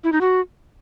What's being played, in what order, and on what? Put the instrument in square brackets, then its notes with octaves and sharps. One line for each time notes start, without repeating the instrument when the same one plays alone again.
[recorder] E4
D#4
F#4